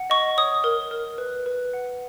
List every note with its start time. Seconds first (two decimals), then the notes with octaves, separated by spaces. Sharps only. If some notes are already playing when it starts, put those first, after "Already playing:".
Already playing: F#5
0.10 D#5 C#6
0.38 C#5 D#6
0.64 A#4
0.91 A#4
1.18 B4
1.46 B4
1.73 F#5